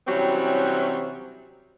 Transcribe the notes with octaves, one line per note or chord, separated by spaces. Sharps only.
C3 E3 F#3 G3 C4 C#4